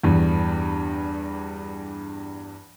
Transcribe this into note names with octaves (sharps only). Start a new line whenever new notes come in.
E2 G2